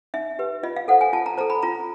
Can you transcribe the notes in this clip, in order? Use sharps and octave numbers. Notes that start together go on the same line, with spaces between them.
D#4 E5
G4 B4
F4 D#5
F5
A4 C5 F#5
G#5
F4 A5
A#5
A4 C5 A#5
B5
F4 A#5